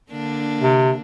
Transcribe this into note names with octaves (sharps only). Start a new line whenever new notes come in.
D3 A#3 D4
C3